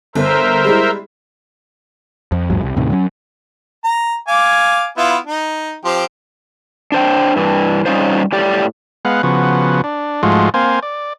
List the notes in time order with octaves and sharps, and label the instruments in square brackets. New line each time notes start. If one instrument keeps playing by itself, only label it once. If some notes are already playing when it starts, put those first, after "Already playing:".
[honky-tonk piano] G1 [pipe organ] A#4 C5 E5
[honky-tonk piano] G3 G#3 E4
[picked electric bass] F2
A#1 E2 G#2 F#3
C2
D#2 A2 C3 D#3
F#3 C#4
[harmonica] A#5
F5 G#5 D6
B3 E4 F4
D#4
F3 C4 G4
[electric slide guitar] D4 C5 G5
G2 E3
G3 C#4 D#4 F4 C5
A2 G4 D5
[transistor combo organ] G#3 B3 F5 F#5
C#3 F3 B3 F#4
D4
G#2 F3 G#3 A3 F4 F#4
A#3 C4 C5 F5 G#5
D5